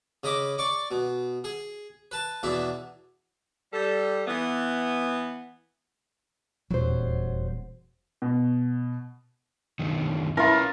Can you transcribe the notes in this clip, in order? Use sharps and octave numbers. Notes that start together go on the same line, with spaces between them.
C#3 D#5 B5 D6
D5 C#6 D6
B2
G#4
B4 A5
E2 B2 D4 E5
G3 A4
E3 B3
D#1 E2 F#3 C5
B2
F#2 D3 D#3
C#4 E4 F4 A#4 B4